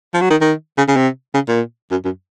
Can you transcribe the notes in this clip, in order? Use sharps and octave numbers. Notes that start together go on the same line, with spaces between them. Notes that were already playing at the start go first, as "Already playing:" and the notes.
F3
F#3
D#3
D#3
C#3
C#3
C3
C#3
A#2
F#2
F#2